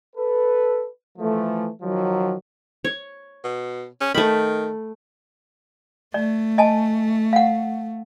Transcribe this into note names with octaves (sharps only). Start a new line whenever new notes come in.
A4 B4
E3 F3 A3
D#3 F3 F#3
C#5
B2
C#4
D#3 A3 B5
A3 D5
D#5 G#5 A5
F5 F#5